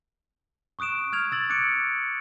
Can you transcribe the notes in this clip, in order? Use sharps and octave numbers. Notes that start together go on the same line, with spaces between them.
C#6 D#6 F#6 D7 E7
F6 G#6 F7
E6 A6 F#7
D6 F#6 C#7 D7